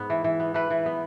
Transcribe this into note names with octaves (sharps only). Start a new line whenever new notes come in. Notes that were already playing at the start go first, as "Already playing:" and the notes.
Already playing: G#2 B3
E3
E3
B3
E3 B4
E3
B3